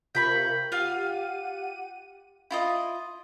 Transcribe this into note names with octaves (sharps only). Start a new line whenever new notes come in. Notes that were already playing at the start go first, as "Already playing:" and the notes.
C3 F4 A#4 G5 B5 C#6
F4 G4 F5 F#5 D#7
E4 F4 D#5